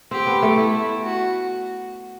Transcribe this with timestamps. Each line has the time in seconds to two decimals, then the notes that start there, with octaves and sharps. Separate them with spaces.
0.11 C4 G4
0.27 B3
0.43 A3
0.57 E4
1.04 F#4